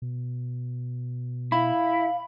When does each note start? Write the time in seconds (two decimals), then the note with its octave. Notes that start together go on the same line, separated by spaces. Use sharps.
0.02 B2
1.52 E4 F5 B5